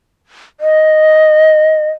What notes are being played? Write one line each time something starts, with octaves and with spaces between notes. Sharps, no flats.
D#5